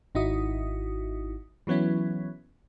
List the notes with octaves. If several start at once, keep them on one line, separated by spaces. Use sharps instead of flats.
G#1 D#4 E4 F#4 D#6
E3 F#3 B3 C#4 E4